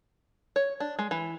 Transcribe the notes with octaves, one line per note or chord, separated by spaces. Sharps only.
C#5
D4
G#3
E3